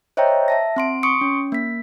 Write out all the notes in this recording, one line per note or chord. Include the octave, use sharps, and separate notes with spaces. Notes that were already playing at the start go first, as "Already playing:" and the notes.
C5 C#5 D#5 E5 G5 A#5
E5 A5 A#6
C4 C6 D7
C6 C#6 D#6 C#7 D7
C#4
A#3 B6